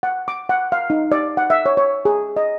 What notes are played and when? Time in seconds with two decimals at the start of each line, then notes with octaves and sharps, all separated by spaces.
0.03 F#5
0.28 D6
0.49 F#5
0.72 F5
0.90 D#4
1.12 D5
1.37 F#5
1.50 E5
1.66 C#5
1.77 C#5
2.05 G#4
2.36 D#5